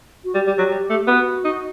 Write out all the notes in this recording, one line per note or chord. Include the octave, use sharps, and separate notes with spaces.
F#4
G3 G4
G3
F#3
G3
A3
B3 F#4
D#4 F#4